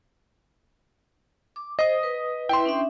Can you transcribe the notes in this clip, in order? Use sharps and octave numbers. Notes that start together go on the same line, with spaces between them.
D6
C5 D#5 D#6
B4
E4 B4 E5 G5 C6
C#4 D4 E5